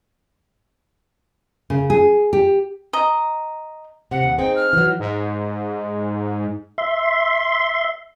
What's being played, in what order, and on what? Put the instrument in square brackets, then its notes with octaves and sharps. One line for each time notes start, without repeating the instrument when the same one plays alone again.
[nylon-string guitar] C#3
G#4
G4
[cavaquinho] D#5 A#5
[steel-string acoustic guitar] C3 [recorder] F#5
[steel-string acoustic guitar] D#2
[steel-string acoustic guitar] C4 D#4 G#4 [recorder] G5
[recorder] F6
[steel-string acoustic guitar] E3 F#3
[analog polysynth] G#2
[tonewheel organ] E5 C6